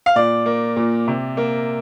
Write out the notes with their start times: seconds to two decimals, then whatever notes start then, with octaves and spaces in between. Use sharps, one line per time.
0.06 F5
0.16 A#2 D5
0.46 A#3
0.76 A#2
1.08 C3
1.37 A#3